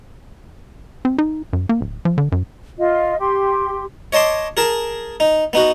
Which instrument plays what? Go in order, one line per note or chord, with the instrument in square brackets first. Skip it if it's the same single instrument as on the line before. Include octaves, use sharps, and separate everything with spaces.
[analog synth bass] C4
D#4
F#2
A#3
D1
F3
D3
F#2
[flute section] F4 D#5
G4 C6
[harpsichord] C#5 D#5 A5 C6 D6
G#4 A#4 A5
D#4
B3 D#4 F#4